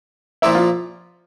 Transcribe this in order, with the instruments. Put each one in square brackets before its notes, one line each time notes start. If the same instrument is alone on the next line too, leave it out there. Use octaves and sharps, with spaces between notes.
[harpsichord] A#2 F3 A#3 [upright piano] E4
[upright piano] F4